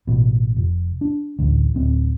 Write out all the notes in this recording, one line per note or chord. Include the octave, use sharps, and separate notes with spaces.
A1 B2
F1
D4
A1 D2
D1 C4